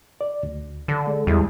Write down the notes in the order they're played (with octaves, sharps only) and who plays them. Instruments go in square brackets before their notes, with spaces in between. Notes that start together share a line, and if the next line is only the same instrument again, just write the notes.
[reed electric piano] D5
D2
[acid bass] D3
[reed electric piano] G#3
[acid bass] E2 [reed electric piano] G3 G#3 E4